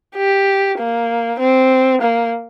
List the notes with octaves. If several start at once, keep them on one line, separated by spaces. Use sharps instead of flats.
G4
A#3
C4
A#3